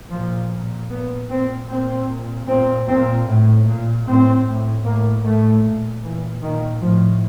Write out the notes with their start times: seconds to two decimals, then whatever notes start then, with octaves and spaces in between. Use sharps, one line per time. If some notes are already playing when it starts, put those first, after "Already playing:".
0.11 A#2 F3
0.51 A#2
0.91 A#2 B3
1.29 A#2 C4
1.69 A#2 C4
2.08 A#2
2.47 A#2 C4
2.87 A#2 C4
3.26 A2
3.66 A#2
4.06 A2 C4
4.44 A2
4.84 A2 A#3
5.23 A2 A3
5.63 A#2
6.02 A#2 E3
6.41 A#2 D#3
6.81 A2 F3